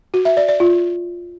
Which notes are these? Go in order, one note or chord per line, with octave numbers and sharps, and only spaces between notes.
F#4
E5
D5
D5
F4